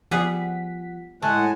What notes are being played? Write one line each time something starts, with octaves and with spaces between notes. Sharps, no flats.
F3 G3 B3 G#4 F#5 B6
A2 G#3 A3 F#5 G#5 A5